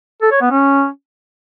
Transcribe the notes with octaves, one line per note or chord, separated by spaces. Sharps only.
A4
C#5
B3
C#4